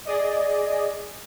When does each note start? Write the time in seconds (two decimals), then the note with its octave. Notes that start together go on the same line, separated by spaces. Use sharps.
0.05 G#4 D5 D#5